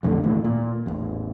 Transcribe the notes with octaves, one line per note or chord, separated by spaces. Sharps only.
B1 F2 A2 D3
D#2 A2 E3
A#2
A1 E2